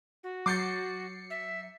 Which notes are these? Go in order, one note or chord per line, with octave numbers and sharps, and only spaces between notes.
F#4
F#3 D6 G6 A6 C7 C#7
E5